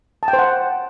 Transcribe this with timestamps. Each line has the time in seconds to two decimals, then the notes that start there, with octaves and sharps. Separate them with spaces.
0.23 A5
0.28 G5
0.33 C5
0.39 F#5